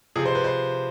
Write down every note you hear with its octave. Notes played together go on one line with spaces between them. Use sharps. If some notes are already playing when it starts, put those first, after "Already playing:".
C3 F3 G#4
C5
B4
C5